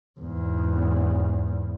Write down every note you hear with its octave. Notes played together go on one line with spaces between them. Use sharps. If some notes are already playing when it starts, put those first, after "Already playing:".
E2 G#2